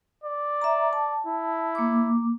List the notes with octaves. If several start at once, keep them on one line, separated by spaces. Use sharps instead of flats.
D5
E5 A#5
A5
E4
A#3 D6